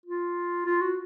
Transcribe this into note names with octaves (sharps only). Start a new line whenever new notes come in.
F4
F4
F#4